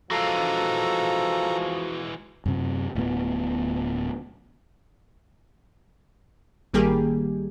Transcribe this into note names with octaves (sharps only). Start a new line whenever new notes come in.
E3 F3 G#3 F#4 A4 F5 A#5
F#2 C3
D1 A2 B3
A1 D#3 G3 A#3 G4 G#4